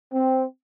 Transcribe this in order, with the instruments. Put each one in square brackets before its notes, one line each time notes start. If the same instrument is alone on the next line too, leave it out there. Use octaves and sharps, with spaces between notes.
[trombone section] C4